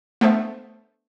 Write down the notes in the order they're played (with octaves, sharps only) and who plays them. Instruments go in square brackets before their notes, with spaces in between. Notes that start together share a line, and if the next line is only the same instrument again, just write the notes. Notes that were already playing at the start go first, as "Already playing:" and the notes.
[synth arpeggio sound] A3 B3 D4 A4 C5 E5